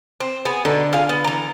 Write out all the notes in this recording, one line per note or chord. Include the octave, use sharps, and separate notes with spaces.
C4
B3 G#4
B2 D3 D#4
F4 G#4 F5
B3
E3 A#5